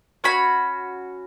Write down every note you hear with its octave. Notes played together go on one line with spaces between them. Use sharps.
C#4 F#4 B5